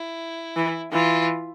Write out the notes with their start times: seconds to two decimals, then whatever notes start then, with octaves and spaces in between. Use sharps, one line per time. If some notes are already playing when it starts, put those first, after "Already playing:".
Already playing: E4
0.56 E3
0.92 E3 F4